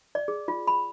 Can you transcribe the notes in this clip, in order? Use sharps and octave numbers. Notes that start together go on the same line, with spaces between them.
D5
G#4
F4
B5